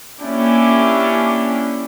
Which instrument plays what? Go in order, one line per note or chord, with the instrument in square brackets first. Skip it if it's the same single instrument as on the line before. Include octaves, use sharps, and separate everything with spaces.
[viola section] A#3 C#4 D4 E4 G4